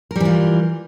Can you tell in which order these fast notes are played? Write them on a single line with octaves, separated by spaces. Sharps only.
A#4 G3 E3 F4